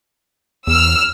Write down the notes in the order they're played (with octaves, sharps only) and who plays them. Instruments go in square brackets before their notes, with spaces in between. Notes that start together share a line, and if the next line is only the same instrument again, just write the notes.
[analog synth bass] E2 [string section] E6 F6